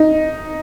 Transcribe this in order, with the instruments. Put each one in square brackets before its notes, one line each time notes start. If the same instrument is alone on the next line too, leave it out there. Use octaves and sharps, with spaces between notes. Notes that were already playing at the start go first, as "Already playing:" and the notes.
Already playing: [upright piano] D#4